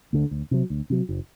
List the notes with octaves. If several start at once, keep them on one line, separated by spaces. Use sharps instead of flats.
D2 D3
D2
C3 F#3
D2
C3 F#3
F#1